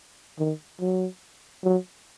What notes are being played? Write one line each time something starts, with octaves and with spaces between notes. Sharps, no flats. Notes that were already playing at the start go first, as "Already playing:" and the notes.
D#3
F#3
F#3